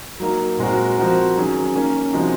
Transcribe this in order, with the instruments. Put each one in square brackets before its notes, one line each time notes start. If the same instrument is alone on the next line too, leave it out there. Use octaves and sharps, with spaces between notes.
[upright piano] F#3 A#3 D#4
A#2 G#3 C4 F#4 A#4
F3 C4 F#4 A#4
D#3 F#3 C#4 G#4
D#3 A#3 C#4
C3 F3 G#3 D#4 F#4